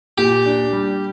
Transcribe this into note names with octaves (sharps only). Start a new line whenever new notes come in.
A#2 G4
D4
G3